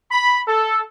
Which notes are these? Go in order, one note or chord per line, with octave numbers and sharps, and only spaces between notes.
B5
A4